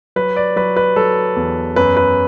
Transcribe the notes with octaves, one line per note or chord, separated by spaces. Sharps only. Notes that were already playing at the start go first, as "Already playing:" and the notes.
F#3 B4
D5
F#3 B4
B4
F#3 A4
E2
F#2 B4
B4